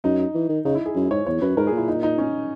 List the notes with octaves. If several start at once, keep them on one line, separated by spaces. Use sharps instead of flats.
F#2 D#4
E3
D#3
C#3 D#4
E4
G#4
F#2
G#2 C#5
E2 C#5
F#2 B4
G#2 A#4
G#4
A#2
E4
D#4
D#4
C#4